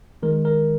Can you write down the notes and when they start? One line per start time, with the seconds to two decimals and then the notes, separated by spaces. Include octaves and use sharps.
0.23 D#3 G#3 A#4
0.45 A#4